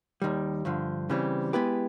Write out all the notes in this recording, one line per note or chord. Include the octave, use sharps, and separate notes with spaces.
D#2 D#3 G3
G2 D3 F3
C#3 E3 G3 C4
G#3 B3 E4 G4 B4